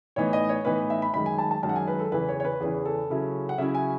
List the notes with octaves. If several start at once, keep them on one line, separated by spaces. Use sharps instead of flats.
A2 E3 B3 D#4 C#5
D#5
C#5
A2 E3 B3 D#4 B4
E5
B5
F#2 D#3 G#3 B5
G#5
A5
A5
F#2 D#3 G#3 A5
F#5
G#5
B4
A4
E2 C#3 E3 B4
C#5
C#5
B4
E2 C#3 E3 G#4
A4
C#3 F#3 C#4 E4
F#5
C#3 F#3 C#4 E4 E5
G#5